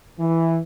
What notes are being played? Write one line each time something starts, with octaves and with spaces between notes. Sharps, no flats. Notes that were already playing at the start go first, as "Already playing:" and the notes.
E3